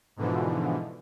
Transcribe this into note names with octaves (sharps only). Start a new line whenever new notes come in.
G#2 B2 D3 E3 F3